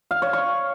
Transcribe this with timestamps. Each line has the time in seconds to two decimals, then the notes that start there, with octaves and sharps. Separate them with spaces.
0.11 F5
0.22 C#5
0.33 C#6